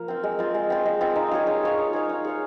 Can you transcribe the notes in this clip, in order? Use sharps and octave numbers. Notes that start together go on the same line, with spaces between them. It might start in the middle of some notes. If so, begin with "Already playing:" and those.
Already playing: F3 A#3
C4 F4
G#3
C4 F4
G#3
C4 F4
G#3
C4 F4
D#4
G#4 C#5 F5
D#4
G#4 C#5 F5
D#4
G#4 C#5 F5
D#4
G#4 C#5 F5